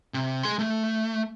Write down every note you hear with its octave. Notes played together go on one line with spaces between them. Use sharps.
C3
G#4 C6
A3